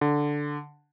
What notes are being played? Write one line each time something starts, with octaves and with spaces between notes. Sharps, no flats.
D3